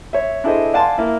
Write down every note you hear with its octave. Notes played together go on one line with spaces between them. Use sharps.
C#5 E5
D4 E4 G#4 A4 C5 D#5
D5 F5 F#5 G#5 A5 C6
A#3 E4